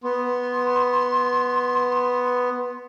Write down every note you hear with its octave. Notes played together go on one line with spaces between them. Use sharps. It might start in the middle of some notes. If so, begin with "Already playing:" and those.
B3 C6